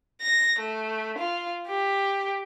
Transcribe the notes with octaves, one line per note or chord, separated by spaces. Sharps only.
A#6
A3
F4
G4